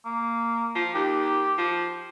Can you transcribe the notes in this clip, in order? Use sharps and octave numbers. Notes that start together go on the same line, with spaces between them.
A#3
F3
D#2 G4
F3